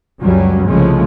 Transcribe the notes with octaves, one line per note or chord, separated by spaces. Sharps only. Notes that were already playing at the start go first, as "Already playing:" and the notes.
C#2 F#2 F#3 G3 C#4
C2 C#3 F3 G#3 A3 C#4